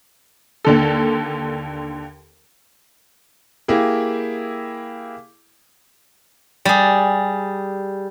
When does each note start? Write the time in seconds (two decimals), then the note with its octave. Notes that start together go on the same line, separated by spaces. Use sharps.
0.65 D#2 D3 A4
3.68 A#3 E4 G4 G#4
6.65 G3 G#4